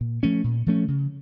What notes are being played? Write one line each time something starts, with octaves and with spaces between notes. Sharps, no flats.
A#2
F3 A3 C#4
A#2
F3 A3 C#4
C#3